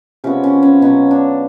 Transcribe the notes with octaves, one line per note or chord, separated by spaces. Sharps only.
C3 F3 G#3 B3 C#4
C#4
C#4
B2 F#3 B3 C#4
D4